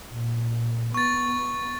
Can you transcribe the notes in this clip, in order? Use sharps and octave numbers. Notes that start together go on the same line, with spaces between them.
A#2
B3 C#6 A6